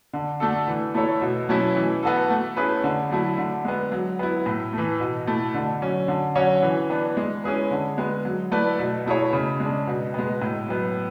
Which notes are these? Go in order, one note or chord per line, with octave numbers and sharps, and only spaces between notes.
D3
A3 D4 F#4 A4
E3
A3 E4 A4 C#5
B2
F#3 A3 C#4 E4
E3
B3 F#4 A4
A3
C#4 E4 G#4 B4
D3
F#3 A3 E4
D3
G#3 B3
F#3
B3 E4
A2
E3 A3
B2
A3 E4
D3
F#3 C#4
D3
F#3 C#4 F#4 C#5
E3
B3 D4
G#3
C#4 E4 G#4 B4
D3
G#3 B3
F#3
A3 E4 B4 D5
B2
A3 E4 G#4 C#5
C#3
G#3 D4
B2
G#3 B3
A2
F#3 B3